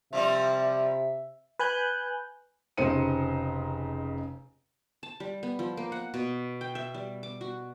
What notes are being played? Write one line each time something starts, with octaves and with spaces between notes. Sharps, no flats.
C3 F3 G3 C4 E5
B4 G#5 F#6 G6
F1 C#3 D#4 C5 C#7 D#7
A5
G3
B3
F3
A#3
F#5
B2
G5
E5
G3
D6
F#4